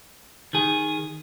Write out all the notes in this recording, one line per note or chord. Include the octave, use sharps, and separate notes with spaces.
D#3 G#4